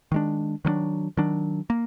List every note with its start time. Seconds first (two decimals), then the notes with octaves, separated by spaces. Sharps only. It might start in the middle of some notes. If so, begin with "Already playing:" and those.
0.12 D#3 G#3 D4
0.65 D#3 F#3 A#3 D4
1.17 D#3 F#3 D4
1.70 A#3